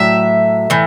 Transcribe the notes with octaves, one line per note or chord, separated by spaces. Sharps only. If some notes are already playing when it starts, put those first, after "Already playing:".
Already playing: A2 F#3 E5
A2 E3